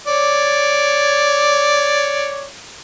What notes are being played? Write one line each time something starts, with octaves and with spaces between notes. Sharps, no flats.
C#5 D5